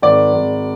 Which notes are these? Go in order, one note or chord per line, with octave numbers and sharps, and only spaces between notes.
G#1 D5
G#1